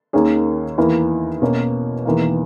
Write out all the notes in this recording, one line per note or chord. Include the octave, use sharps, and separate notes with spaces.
D#2 D#3 A#3 C#4 G#4
E2 D#3 A#3 E4 A#4
B2 A#3 C#4
E1 E2 D#3 A#3